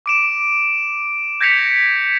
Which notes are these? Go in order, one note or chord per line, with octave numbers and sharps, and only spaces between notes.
D6 D7 E7
G6 G#6 A#6 B6 C#7 F7